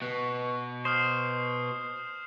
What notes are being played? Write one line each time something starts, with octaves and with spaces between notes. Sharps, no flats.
B2 F#6
C5 D#6 F6 C7